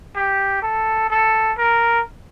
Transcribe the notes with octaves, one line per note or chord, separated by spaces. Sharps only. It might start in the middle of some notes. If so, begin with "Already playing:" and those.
G4
A4
A4
A#4